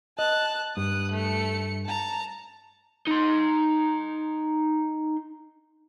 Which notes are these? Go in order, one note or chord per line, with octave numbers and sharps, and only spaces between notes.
D#5 A5 F#6
G2 D#6 F#6
A3 C#7
A5 A#5
D#4 C6